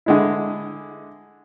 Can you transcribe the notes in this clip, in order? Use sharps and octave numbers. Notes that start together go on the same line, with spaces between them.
D3 G#3 E4